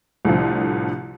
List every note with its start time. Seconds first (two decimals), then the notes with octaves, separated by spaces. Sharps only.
0.25 C2 A2 D3 F3